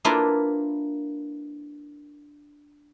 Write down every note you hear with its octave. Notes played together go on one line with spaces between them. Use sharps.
A#3 D4 E4 F4 A#4 B4